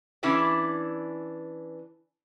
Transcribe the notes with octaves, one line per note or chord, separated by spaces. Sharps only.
E3 C#4 D4 E4 G#4 D5